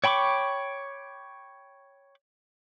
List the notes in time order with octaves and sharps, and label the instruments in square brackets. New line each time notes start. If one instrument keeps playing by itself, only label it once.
[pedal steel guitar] C#5 G5 B5 C#6 D6